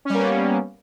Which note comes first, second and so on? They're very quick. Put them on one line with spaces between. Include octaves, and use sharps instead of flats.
C#4 G3 A#3 B3